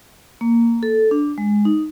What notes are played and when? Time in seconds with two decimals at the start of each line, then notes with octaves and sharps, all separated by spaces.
0.41 A#3
0.83 A4
1.11 D4
1.38 G#3
1.65 D#4